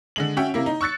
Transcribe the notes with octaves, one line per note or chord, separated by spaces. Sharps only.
D3 G#3 F#7
C#4 F#4 C#5 E5 G5
C3 A#3 E4
D#4
C#6 E6 F#6 A6 C#7